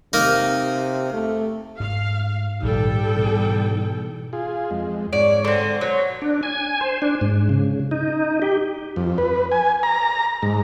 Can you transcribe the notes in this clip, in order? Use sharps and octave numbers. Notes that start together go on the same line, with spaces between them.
C3 A#3 D#4
A3
G#2 F5
A#1 G#2 D#3 G3 A4 G5
B2 E3
F4 G#4
F2 G#3
G#2 C#5 D5
D3 C4
F#3 C5 C#5
D4
G#5
C5
D4
G#2
C#3
D#4
G4
F2
B4
G#5
A#5
G#2